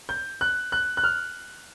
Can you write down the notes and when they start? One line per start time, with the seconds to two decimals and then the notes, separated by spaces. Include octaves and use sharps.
0.09 G6
0.41 F#6
0.72 F#6
0.97 F#6
1.04 F6